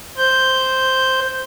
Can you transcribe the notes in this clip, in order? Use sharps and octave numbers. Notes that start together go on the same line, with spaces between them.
C5 G6